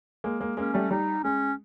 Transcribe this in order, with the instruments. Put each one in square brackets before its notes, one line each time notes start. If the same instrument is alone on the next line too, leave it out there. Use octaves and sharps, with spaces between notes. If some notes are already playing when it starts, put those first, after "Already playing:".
[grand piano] G#3 A#3
G#3 A#3
[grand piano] G#3 A#3 [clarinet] C#4
[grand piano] G3 A3
[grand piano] G3 [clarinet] D#4
[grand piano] G#3 [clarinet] C#4